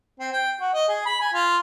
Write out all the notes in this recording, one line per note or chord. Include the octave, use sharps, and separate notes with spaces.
C4
G5
F#4
D#5
G#4
B5
G#5
F4